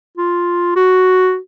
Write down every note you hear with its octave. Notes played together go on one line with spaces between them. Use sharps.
F4
F#4